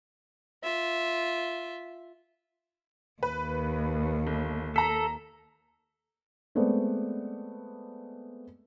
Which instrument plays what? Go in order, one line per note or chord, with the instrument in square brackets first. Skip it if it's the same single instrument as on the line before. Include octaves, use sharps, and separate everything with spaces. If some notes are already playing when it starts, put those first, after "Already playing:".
[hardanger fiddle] F4 E5
[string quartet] D#2 [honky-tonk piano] B4
[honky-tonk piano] G1
[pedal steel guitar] A4 [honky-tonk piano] A#5 B6
[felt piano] G#3 A3 B3 C4 D5